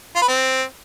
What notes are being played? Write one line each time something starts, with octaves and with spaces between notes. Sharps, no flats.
F4
B4
C4